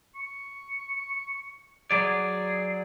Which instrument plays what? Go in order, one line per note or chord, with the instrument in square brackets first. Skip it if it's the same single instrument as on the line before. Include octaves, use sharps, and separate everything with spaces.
[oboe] C#6
[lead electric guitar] F#3 D5 [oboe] G#4